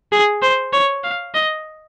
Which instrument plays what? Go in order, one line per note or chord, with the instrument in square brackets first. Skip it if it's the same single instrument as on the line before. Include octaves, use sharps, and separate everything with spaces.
[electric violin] G#4
C5
C#5
F5
D#5